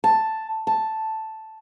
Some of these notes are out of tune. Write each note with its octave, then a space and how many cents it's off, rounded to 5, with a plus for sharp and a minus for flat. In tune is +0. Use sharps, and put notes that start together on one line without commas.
A5 +5
A5 +0